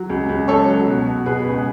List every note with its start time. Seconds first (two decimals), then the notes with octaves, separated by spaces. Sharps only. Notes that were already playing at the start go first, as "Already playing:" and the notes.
Already playing: F#3
0.10 C#2
0.29 C#2
0.48 C#2 A4 C#5
0.67 F#3
0.87 B2
1.07 B2
1.26 B2 G#4 B4
1.46 C#2